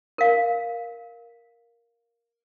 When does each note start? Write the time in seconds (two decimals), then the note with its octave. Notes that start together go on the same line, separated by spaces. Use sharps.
0.18 A#4 F5